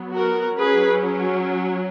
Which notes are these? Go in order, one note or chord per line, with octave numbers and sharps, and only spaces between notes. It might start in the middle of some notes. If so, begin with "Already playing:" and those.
Already playing: F#3 B3
F#4 A#4
F#3 C#4 G#4 B4